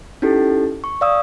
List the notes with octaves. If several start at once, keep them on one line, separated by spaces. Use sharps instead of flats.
C#4 D#4 E4 G4 A4
C#6
D5 F5 D#6 E6